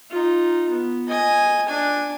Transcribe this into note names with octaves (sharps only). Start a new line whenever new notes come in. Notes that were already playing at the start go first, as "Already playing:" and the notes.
D#4 F4
B3
D#5 G#5
D4 G#5